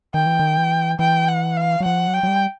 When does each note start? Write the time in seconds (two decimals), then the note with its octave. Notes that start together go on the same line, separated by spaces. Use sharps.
0.14 D#3 G5
0.26 E3
0.39 D#3
0.57 E3
0.99 E3 G5
1.28 F#5
1.57 F5
1.80 F#3
1.85 F3 F#5
2.07 F#3
2.14 G5
2.23 F#3
2.28 G3